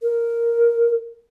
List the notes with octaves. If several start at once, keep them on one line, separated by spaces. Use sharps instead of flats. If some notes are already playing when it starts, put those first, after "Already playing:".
A#4